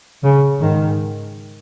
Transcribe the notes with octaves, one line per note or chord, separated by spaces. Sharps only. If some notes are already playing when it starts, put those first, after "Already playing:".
C#3
G#2 D#3